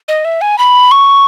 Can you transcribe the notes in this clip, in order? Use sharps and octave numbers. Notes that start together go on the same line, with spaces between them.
D#5
E5
G#5
B5
C#6